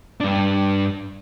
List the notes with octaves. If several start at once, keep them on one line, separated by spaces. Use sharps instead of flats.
G2 D4